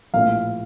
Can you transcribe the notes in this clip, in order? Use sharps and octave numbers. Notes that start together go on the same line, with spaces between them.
A#1 A2 F5